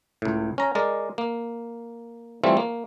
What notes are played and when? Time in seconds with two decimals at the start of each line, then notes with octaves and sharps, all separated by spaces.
0.22 C#2 A2
0.58 C#4 A#5
0.75 G#3 A#4 D5
1.18 A#3
2.44 E3 G3 A3 C4 F4
2.57 A#3